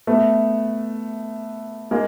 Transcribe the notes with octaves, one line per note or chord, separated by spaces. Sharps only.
A3 B3
G#3 A#3